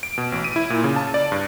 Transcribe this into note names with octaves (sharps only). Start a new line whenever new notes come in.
D7
B2
A1
D#7
E4
A#2
C#3
A5
D5
G2